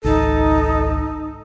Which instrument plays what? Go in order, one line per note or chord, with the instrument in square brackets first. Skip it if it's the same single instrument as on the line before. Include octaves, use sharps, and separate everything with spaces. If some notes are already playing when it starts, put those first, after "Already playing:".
[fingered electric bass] G#1 C#2 [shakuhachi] D#4 [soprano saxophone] A4